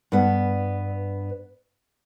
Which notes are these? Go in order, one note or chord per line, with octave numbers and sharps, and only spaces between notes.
G2 B3